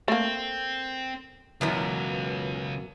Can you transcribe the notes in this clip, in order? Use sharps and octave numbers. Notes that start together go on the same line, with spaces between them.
A3 A#3 C4
C#2 F#2 B2 E3